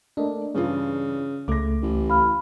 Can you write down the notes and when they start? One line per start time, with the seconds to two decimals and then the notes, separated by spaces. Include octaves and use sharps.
0.17 A3 A#3 D4 D#5
0.55 G2 C#3 E3 F4
1.48 C#2 A3 D6 A#6
1.82 A1
2.10 F5 B5 F6